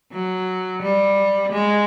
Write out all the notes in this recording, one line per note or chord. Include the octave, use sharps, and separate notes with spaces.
F#3
G3
G#3